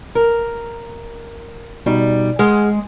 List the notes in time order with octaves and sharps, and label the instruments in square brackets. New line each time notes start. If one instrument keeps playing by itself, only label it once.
[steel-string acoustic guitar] A#4
[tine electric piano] B2 D#4 [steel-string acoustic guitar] G3
[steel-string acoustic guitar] G#3 [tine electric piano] G#4 F#5 F6